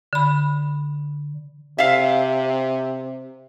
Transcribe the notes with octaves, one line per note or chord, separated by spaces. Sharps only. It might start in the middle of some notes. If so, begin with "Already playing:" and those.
D3 B5
C3 E5 F5